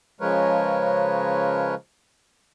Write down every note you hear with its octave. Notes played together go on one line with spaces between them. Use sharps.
C#3 F3 G#3 A#4 B4 C#5